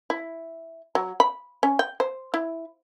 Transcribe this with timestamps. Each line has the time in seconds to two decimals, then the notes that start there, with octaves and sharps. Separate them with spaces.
0.10 E4
0.95 F#3
1.20 B5
1.63 C#4
1.79 G5
2.00 C5
2.34 E4